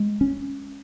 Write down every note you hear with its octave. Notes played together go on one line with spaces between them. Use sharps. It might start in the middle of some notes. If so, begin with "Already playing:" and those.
Already playing: G#3
C#4